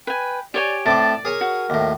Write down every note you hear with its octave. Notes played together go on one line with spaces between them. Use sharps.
B4 G5 G#5
G4 C#5 D5 G#5
A2 C4 D5 A5 D6
G#4 A#4 C#5 G#5
F#4
D#2 A2